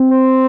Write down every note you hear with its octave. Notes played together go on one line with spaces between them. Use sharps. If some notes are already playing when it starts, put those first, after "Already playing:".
Already playing: C4
C5